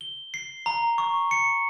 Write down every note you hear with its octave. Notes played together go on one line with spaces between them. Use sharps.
G7
C7
A#5
C#6
C#7